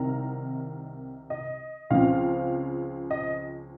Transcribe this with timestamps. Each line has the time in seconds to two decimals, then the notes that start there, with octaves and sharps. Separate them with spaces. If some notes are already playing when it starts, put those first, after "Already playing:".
Already playing: C2 C3 D#3 A#4 A#5
1.30 D#5
1.90 C#2 C#3 F3 C4 F5
3.11 D#5